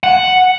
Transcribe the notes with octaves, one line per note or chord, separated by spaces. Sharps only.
F#5